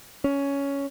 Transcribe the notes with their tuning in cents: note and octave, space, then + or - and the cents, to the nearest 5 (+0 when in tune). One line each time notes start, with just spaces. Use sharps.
C#4 +10